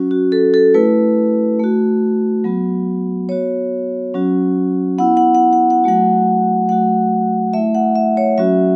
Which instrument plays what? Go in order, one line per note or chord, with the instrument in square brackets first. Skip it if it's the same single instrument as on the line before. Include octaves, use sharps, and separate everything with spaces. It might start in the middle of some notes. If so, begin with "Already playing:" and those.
Already playing: [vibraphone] F#3 C#4 F#4
F#4
A4
A4
A3 E4 B4
A3 F#4
F#3 B3 F#4
B3 F#4 C#5
F#3 C#4 F#4
B3 E4 F#5
F#5
F#5
F#5
F#5
F#3 A3 F#4 F#5
F#3 A3 F#4 F#5
A3 E4 E5
F#5
E5
C#5
F#3 C#4 F#4 E5